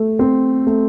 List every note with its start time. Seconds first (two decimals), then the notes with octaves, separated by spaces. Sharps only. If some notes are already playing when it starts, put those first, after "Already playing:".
Already playing: A3
0.19 C4
0.67 A3